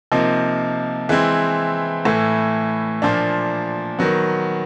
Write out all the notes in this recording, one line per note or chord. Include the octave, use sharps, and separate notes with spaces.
C3 F3 A#3 D#4
E3 G#3 C4 E4
A2 E3 A3
A#2 F3 A#3 D4
D#3 F#3 B3